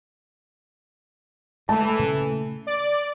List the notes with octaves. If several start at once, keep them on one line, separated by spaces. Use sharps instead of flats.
E3 G#3 A3 A5
A#2 C#3 C#4
D5